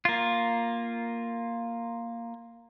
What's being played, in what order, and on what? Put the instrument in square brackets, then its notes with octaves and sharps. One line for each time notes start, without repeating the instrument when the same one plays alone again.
[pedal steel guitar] A#3 F4